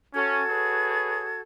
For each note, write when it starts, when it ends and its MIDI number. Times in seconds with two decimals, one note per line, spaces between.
0.14 0.42 61
0.14 1.41 66
0.14 1.41 69
0.14 1.41 92
0.49 1.29 68
0.49 1.29 71
0.49 1.29 73